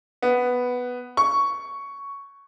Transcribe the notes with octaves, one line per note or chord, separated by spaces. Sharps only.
B3
C#6